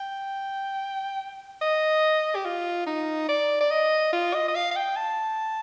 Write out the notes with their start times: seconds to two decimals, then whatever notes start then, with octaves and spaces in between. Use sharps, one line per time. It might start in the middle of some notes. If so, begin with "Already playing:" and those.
Already playing: G5
1.61 D#5
2.35 G4
2.45 F4
2.87 D#4
3.29 D5
3.60 D5
3.70 D#5
4.12 F4
4.34 D#5
4.48 D#5
4.55 F5
4.71 F5
4.76 G5
4.96 A5